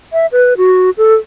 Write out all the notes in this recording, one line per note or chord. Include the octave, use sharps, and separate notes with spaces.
E5
B4
F#4
A4